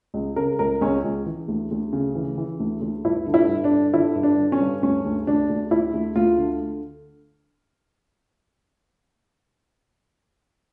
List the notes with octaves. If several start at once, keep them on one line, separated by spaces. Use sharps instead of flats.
C#2
C#3 A#4
C#2 A#4
C#2 C#4
C#2
E3
D2
D2
C#3
E3
E3
D2
D2
G2 E4
D3
E4
G2
D4
D3
D3 E4
G2
D4
D3
C#4
G2
D2 C#4
D2
D2 D4
D2
D2 E4
D2
D2 F4
D3